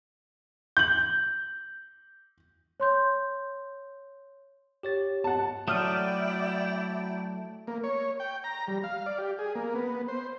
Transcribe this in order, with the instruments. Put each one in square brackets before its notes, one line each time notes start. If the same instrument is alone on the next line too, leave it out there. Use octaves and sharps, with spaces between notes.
[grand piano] G6 F#7
[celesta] C#5 C6 G6
[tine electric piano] G4 C#5 A6
[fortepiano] F#5 A5
[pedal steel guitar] F#3 A3 [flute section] E4 D5 G5 [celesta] D#6 F6 D#7
[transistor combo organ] A#3
C#5
G5
A#5
G3
F5
D5
G4
G#4
A#3
B3
C5